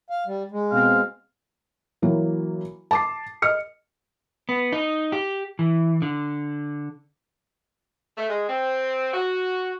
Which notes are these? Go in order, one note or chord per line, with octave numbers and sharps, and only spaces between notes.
F5
G3
G#3
B2 C4 F5
E3 F#3 A#3
A5 D6 C7
D#5 F6 C#7
B3
D#4
G4
E3
D3
A3
G#3
C4
F#4